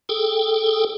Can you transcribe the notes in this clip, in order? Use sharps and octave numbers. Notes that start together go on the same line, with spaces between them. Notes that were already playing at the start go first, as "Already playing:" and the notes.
G#4 A4 G5